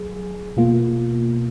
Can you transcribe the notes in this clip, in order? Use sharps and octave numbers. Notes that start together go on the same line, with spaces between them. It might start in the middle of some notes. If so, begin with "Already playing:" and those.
Already playing: F#3 G#4
B2 A#3 F4